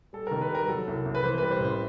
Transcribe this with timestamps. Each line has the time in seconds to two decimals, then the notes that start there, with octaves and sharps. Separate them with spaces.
0.13 G3 A4
0.27 D#3 A#4
0.41 B4
0.50 G3 A#4
0.68 F#3 A4
0.87 C2
1.05 C2
1.15 B4
1.23 E3 C5
1.38 G3 B4
1.51 C5
1.59 A1
1.65 C5